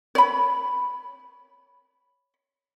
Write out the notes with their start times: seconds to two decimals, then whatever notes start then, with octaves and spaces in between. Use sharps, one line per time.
0.15 C#5 B5